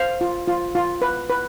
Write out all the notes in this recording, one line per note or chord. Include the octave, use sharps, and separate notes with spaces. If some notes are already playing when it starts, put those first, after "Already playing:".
Already playing: C5 F5
F4
F4
F4
B4
B4